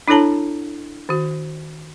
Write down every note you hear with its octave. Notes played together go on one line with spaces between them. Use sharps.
D4 E4 A4 C#5 A5 A#5
D#3 F#4